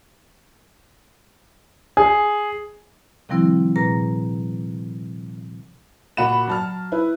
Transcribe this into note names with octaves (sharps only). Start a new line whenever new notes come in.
G#4
C3 D#3 F3 G3 C4 E4
A#2 G#4 B4 A#5 A#6
A#2 F#4 F#5 B5 E7
F#3 A5 F6
E4 B4